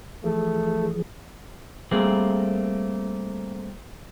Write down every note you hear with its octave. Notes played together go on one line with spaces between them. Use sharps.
E3 F3 A3 G#4
G3 A3 A#3 C4 G#4 A#4